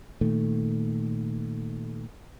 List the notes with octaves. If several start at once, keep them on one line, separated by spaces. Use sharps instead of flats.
A#2 D#3 A3